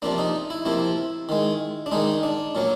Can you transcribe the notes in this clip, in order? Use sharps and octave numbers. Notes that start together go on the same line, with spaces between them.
C3 F3 A#3 D4
D#4
E4
C3 F3 A#3 E4
D#3 G#3
D4
D#3 G#3 D#4
D4
A#2 F#3 A#3